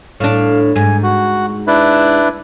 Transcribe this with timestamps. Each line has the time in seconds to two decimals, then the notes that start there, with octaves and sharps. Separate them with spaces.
0.20 A2 D4 F5
0.76 G#2 G#5
1.03 F#4
1.67 D4 E4 B4